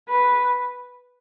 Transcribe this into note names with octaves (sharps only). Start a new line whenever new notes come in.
B4